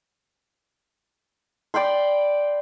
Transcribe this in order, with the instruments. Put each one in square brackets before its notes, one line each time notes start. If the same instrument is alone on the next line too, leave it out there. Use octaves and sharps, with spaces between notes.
[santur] D5 G5 B5 C6